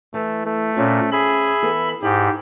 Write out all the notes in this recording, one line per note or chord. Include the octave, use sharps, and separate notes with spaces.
E3 A3
A3
A#2 C4 C#4 G5
G#4 E5 B5
E3 B3 A4
G#2 E4 G4